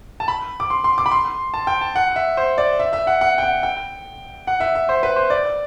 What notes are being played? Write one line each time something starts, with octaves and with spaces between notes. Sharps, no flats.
A5
B5
D6
C6
C6
D6
B5
C6
A5
G5
A5
F#5
E5
C5
D5
E5
E5
F#5
F#5
G5
F#5
G5
F#5
E5
E5
C5
B4
C5
D5